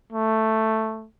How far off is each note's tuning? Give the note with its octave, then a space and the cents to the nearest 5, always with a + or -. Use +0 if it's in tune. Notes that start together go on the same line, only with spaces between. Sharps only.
A3 +5